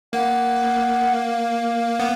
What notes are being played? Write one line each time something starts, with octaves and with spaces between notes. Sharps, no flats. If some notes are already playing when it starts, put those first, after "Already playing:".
A#3 F#5
F5
B3